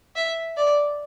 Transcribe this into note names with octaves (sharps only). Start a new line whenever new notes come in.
E5
D5